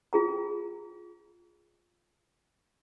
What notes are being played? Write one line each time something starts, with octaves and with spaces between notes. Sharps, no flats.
F4 G#4 A#5